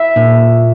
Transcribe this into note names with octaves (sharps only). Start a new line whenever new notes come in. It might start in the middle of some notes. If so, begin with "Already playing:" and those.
Already playing: E5
A#2